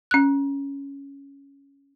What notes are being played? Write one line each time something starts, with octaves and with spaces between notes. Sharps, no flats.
C#4 F#6